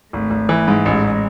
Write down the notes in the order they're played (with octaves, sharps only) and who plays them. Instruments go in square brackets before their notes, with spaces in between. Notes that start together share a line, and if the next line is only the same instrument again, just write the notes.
[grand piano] G#1 [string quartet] A3
[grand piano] G#1
E3
G#2
[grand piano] A1 [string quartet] G#3
[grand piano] A1